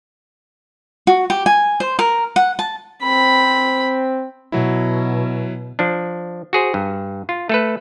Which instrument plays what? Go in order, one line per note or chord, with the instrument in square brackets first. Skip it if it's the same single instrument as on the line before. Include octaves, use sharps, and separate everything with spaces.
[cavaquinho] F#4
G4
G#5
C5
A#4
F#5
A5
[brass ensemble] C4 [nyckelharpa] B5
[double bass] B2 [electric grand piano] F#3 E4
[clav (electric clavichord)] F3 D4
F#4 G#4 C5
G2
F4
A3 A4 B4